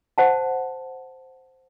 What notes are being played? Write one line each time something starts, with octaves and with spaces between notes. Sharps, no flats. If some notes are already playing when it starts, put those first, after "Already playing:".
C5 F#5 A5